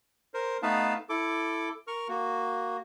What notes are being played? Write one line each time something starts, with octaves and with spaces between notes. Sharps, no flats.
A#4 C5
A3 B3 D#4 B4 F5 A5
E4 A4 D6
A#4 C#6 F6
A#3 F#4